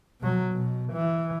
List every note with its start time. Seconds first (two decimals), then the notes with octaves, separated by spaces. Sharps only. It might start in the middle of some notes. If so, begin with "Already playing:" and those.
0.21 B2 F#3
0.53 B2
0.93 E3